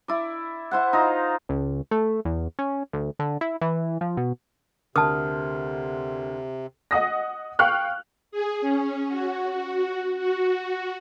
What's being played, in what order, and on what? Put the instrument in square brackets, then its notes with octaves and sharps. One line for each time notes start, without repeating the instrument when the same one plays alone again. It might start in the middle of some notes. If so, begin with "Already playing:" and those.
[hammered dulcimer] E4 D5
E4 C5 F#5
D#4 F4 A#5
[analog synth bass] C#2
A3
E2
C#4
D2
D3
E4
E3
F3
B2
[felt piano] D2 [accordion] C3 [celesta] A#4 F6 [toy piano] A5 D#6
[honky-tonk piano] D#5 F#5 D#6 A#6
F5 G5 C#6 F6 F#6
[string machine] G#4
C#4
F#4
F#4
F#4